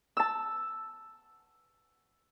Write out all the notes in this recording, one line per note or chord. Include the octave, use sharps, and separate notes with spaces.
A5 E6